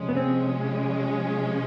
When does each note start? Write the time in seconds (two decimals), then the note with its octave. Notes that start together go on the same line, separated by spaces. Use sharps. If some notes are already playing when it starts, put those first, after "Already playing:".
Already playing: C3 F3 G#3 C#4
0.09 B3
0.17 C4